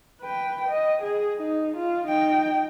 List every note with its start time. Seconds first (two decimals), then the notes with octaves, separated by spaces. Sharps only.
0.22 B4 G5
0.68 D#5
1.02 G#4
1.37 D#4
1.77 F4
2.08 D#4 G5